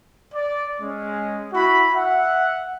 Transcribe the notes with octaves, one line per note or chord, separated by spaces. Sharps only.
D5
G#3 C#4
E4 F#4 B5
E5 F#5